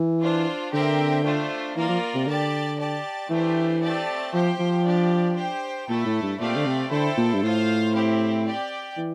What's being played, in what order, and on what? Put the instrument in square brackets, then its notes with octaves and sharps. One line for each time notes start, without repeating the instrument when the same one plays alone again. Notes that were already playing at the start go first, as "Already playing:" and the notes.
Already playing: [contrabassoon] E3
[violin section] D4 F4 C5
[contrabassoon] D3 [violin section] C4 G4 A#4 E5 G5
[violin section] A3 D4 F4 C5
[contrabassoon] E3 [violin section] A#3 F4 A#4 D5
[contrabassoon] F3
C3
[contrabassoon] D3 [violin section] G4 D5 A5
[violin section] G4 D5 A5
[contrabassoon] E3 [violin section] A3 D4 G4 C5
[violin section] A3 C4 G4 D5 A5
[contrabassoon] F3 [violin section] G4 C5 G5
[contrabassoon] F3
[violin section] D4 G4 D5
G4 C5 G5
[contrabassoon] A#2 [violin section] A3 E4 A4
[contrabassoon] A2
G2
[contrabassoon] A#2 [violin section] A3 C4 G4 D5 F5
[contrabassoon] D3
C3
[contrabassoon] D3 [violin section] E4 A4 C5 G5
[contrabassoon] A#2
G2
[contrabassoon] A2 [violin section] F4 C5 F5
[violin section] C4 E4 G4
G4 D5 G5
[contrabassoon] E3